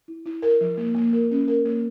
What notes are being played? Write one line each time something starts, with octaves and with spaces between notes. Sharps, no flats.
E4
E4
A#4
F3
A#3
A#3
A#4
C#4
A#4
A#3